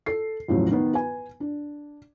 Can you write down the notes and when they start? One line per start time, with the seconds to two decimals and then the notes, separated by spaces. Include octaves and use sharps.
0.06 A4 C7
0.48 E2 A2 C#3 F3 F#3
0.71 D#3 B3
0.94 B4 G#5
1.40 D4